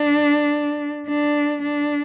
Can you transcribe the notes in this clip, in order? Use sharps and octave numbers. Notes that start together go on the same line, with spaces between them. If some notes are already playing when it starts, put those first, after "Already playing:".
Already playing: D4
D4
D4